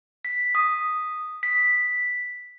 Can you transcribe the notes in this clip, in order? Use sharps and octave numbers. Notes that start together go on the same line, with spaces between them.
B6
D#6
B6